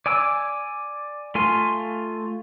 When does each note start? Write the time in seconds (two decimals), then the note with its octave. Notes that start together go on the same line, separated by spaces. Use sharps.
0.06 D5 G#5 D6 E6
1.35 A3 F4 G#5 C6